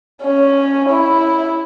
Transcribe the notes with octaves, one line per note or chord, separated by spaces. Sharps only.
C#4
E4